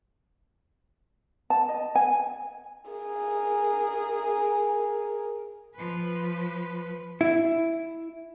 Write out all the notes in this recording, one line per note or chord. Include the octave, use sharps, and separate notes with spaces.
A5
D#5
G#5
G#4 A#4
F3 B4
E4